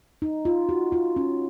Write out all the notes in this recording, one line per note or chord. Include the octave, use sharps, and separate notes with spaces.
D#4
F4
F#4
F4
C#4